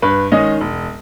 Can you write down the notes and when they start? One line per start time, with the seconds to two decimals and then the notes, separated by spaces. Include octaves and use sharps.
0.02 G2 B4
0.32 D#3 G#3 C#4 D#5
0.61 E1